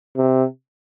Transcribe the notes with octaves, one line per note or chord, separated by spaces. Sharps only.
C3